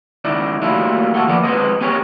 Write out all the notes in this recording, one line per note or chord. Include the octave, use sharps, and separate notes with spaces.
C#2 D#3 D#4 E4 D5
F#3 G3 A3 A#3 E4 F4
A3 F#4 G4 A4
D#2 F3 A#3 B3 D5
G#3 C4 B4 C5 D#5
B3 C4 G4 G#4 A#4 C#5